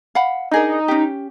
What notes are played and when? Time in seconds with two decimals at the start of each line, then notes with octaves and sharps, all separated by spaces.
0.15 F5 F#5 B5
0.51 D4 D#4 G#4 A#4
0.88 C#4 G4